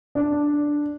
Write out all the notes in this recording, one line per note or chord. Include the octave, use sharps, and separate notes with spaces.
D4